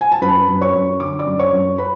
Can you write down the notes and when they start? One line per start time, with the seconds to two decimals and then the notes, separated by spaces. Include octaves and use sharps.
0.01 G#5
0.12 A5
0.21 F#2 B4 B5
0.49 F#2
0.61 C#5 C#6
0.74 F#2
1.00 D3 D6
1.19 D5 D6
1.27 F#2
1.39 C#5 C#6
1.53 F#2
1.78 B4 B5